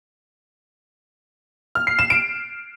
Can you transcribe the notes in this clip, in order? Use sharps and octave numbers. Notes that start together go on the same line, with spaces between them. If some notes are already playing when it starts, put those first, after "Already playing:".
F6
C7
E7
D7